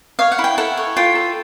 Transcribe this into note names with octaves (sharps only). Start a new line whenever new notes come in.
C#5 F5
F#5
E4
G5
A4 F#5
C#5
F4 G5
A4